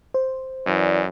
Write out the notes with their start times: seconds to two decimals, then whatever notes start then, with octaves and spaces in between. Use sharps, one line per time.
0.14 C5
0.66 F#2 E3 D5